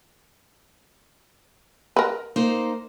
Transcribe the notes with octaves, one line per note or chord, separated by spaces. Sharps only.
A#4 B4
A#3 D#4 C5